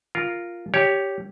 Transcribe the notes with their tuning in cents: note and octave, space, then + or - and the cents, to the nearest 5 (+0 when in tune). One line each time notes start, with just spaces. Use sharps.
F4 +0 A#4 +0
G4 -5 C#5 +10